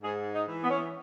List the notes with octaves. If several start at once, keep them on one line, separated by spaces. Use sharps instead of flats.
G#2 G#4
D#4
E3
B3
C#4
B3